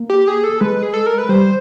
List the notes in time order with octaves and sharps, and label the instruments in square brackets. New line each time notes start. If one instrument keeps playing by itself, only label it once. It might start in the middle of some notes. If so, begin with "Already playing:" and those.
Already playing: [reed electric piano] A#3
[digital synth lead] G4
G#4
A4
[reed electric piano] G#3 [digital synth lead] B4
[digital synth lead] G#4
A4
A#4
B4
[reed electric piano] G3 [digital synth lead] C5